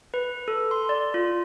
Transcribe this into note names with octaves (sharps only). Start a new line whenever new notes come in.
B4
A4
C6
D5
F4